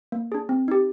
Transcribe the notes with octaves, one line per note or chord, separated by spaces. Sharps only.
A#3
D4 G#4
C4
D#4 G4